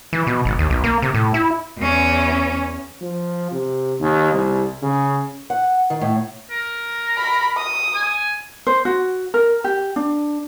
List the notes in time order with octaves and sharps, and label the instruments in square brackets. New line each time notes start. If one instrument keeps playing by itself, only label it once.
[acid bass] E3
B2
G#1
D#2
B1
A#3
C3
A2
E4
[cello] E2 C#4
[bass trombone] F3
C3
D#2
C2
C#3
[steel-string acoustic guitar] F#5
D#3
A2
[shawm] A#4
[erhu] B5
D#6
[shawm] G#5
[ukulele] C5
F#4
A#4
G4
D4